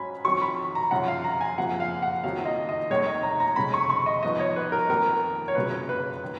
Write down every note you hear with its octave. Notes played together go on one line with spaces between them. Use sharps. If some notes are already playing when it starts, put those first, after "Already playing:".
Already playing: G#2 F#3 C#4 G#5 B5
F2 D#3 F#3 C#6
B5
A#5
F#2 C#3 F3 F#5
F5
A#5
G#5
F#1 F2 F3 F#5
F5
F#5
F#1 F2 D#3 F#3 F5
D#5
D#5
F1 D#2 D#3 G#3 C#5
D#5
A#5
A#5
F1 D#2 C#3 G#3 B5
C#6
C#6
D#5
G#2 F3 B3 D#4 D#5
C#5
B4
A#4
F2 D#3 A#3 A#4
C#5
F#1 F2 C#3 F#3 B4
B4
D#3